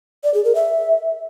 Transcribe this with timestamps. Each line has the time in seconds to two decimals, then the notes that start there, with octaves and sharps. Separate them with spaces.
0.24 D5
0.34 G#4
0.45 A#4
0.55 E5